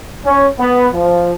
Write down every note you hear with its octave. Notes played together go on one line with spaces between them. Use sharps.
C#4
B3
F3